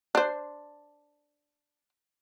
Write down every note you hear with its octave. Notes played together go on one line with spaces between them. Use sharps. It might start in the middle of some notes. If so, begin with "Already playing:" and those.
D4 C5